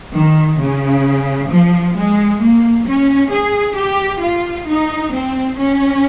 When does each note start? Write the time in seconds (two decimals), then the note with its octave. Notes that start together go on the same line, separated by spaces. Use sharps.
0.15 D#3
0.61 C#3
1.51 F3
1.97 G#3
2.41 A#3
2.87 C#4
3.33 G#4
3.77 G4
4.23 F4
4.68 D#4
5.13 C4
5.59 C#4